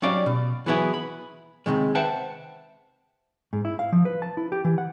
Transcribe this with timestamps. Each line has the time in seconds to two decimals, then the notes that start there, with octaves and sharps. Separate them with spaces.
0.02 F#3 G3 C#4 D#4 D5 F5
0.26 B2
0.66 E3 F#3 B3 E4 G#4
0.94 B5
1.66 C#2 G2 C3 D#3 G#3
1.95 B4 C5 E5 F#5 G5 A5
3.53 G#2
3.65 E4
3.79 F5
3.92 F3
4.05 B4
4.22 A5
4.37 E4
4.52 G4
4.65 E3
4.78 F#5